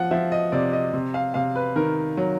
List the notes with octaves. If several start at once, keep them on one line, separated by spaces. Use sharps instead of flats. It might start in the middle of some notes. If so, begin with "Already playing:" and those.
Already playing: F3 F#5
F3 E5
D#5
C3 D5
D#5
C3
F5
C3 F5
B4
D#3 A#4
F#3